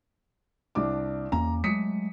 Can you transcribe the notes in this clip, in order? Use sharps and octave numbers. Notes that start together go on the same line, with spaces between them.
C2 D4 D6
E2 A#3 C#4 A#5
F#3 G#3 A3 D#6 B6 C#7